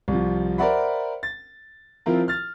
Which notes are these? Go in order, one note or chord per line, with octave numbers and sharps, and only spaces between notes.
C2 F3
A#4 C5 D5 E5 F#5 B5
A6
F3 C4 E4 F4 A#4
F6 A6